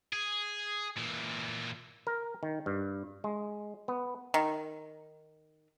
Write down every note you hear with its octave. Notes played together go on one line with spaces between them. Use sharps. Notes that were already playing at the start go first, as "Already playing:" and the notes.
G#4
A#2 E3
A#4
D#3
G2
G#3
B3
D#3